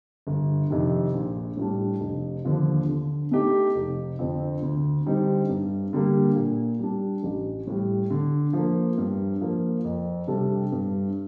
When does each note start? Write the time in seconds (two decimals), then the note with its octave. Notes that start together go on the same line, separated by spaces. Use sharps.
0.27 G1
0.70 F2 C3 D#3
1.14 A#1
1.57 A2 G3 D4
2.01 F1
2.45 D#2 D3 F3
2.89 D3
3.31 A3 D#4 G4
3.75 F1
4.19 F2 D3 F3 C4
4.62 D2
5.06 D3 G3 C4 D#4
5.49 G2
5.93 D3 G3 A#3
6.36 A#2
6.79 G3 D4
7.23 A1
7.67 A2 G3
8.10 D3
8.53 F3 A#3
8.98 G2
9.41 F3 A#3
9.84 F2
10.27 C3 G3 D4 A4
10.72 G2